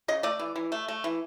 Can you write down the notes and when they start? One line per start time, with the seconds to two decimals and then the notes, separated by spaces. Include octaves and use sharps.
0.08 C#3 D#5
0.23 A3 D5
0.40 E3
0.56 E3
0.72 A3
0.88 A3
1.04 E3